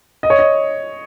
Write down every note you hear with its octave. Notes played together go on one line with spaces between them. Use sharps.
D#5
C#5
D#5